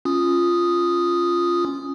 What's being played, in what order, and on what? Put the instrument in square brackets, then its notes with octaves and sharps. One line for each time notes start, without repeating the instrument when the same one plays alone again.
[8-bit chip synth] C#4 F4 D#6